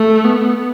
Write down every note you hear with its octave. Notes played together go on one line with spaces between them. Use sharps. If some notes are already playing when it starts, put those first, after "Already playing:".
Already playing: A3
B3